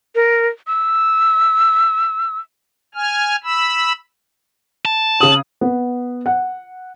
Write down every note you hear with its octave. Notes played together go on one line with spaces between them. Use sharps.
A#4
E6
G#5 F6
B5 E6
A5
C#3 D#6 F#7
B3
F#5